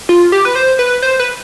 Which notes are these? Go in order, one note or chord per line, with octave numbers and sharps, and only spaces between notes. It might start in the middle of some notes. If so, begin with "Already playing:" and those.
F4
G4
B4
C5
B4
C5
B4